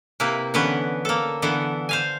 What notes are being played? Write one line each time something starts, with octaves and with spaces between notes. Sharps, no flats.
C3 A#3 E4 B4
D3 E3 B3 C#4 B4
A#3 A4
D3 E3 B3 A4
C5 F5 G#5